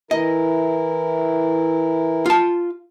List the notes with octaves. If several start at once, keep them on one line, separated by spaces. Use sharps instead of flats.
E3 E4 A#4 D#5
F4 A5